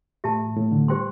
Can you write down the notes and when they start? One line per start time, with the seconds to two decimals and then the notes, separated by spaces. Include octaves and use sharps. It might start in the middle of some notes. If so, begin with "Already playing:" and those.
0.24 A2 G4 E5 A5
0.56 A2
0.72 D3
0.88 G3 G4 C5 G5 C6